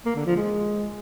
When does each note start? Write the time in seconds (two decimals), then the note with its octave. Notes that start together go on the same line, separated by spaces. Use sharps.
0.06 A#3
0.16 D3
0.26 F3
0.36 G#3